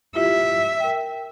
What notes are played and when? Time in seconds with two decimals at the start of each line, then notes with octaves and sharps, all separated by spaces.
0.15 E4 F4 G4 E5
0.80 A#4 G5